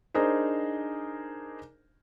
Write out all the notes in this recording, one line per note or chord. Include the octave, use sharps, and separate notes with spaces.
D4 D#4 G#4 A#4 C5